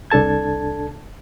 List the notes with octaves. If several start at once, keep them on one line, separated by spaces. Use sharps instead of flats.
C2 D4 A4 A5 G#6